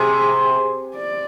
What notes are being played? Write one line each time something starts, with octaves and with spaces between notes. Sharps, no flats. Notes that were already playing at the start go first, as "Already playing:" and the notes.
Already playing: C3 G#4
D5